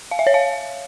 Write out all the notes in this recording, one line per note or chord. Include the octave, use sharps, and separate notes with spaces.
F5
E5
C#5
F5